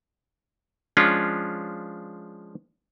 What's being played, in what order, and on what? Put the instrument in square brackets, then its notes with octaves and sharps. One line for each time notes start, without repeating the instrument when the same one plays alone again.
[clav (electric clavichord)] F3 G#3 C#4 D4 F4